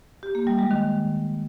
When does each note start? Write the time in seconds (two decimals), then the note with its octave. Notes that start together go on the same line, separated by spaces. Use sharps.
0.23 G4
0.35 A#3
0.47 G3
0.59 G#3
0.71 D#3